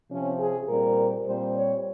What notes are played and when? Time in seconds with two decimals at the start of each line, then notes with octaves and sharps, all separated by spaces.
0.10 C3 F3 C4 C#4
0.39 G#4
0.68 A#2 G3 C4 A#4
1.26 A#2 G3 C4 C5
1.55 C#5